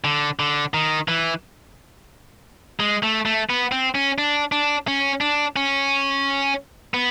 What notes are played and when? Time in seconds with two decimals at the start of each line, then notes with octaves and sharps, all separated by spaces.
0.04 D3
0.39 D3
0.74 D#3
1.08 E3
2.80 G#3
3.03 A3
3.25 A3
3.50 B3
3.72 C4
3.95 C#4
4.18 D4
4.52 D4
4.87 C#4
5.21 D4
5.56 C#4
6.94 B3